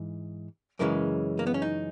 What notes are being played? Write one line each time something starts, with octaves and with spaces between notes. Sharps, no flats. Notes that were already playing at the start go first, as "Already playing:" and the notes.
Already playing: G#2 E3
F#2 C#3 E3 G#3 A#4
A#3
B3
C#4
D#4